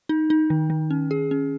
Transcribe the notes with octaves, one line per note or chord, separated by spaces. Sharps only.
D#4
D#4
D#3
D#3
C#4
G#4
C#4